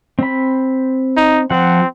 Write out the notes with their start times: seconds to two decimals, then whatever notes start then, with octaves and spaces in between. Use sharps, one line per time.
0.19 C4 B5
1.17 D#4
1.50 F3 C4 F#5